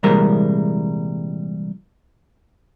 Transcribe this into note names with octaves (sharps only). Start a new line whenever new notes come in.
C2 A#2 E3 G3 G#3 A#4